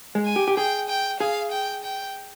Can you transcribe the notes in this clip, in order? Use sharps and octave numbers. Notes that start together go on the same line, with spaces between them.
G#3
G#5
G4
G4
G#4 G5
G5
G#4 F5
G5
G5